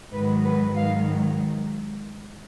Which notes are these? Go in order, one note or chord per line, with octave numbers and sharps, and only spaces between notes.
G#2 D#3 F#3 B4
B4
G#2 D#3 F#3 F5